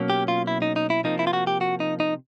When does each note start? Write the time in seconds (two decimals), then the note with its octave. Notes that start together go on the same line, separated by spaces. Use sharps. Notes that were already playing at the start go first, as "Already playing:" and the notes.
Already playing: B2 F#3 A#3 C#4
0.10 G4
0.28 F4
0.47 E4
0.62 D#4
0.76 D#4
0.90 E4
1.04 C3 F3 A#3 D#4
1.19 E4
1.27 F4
1.33 F#4
1.47 G4
1.61 F#4
1.80 D#4
2.00 D#4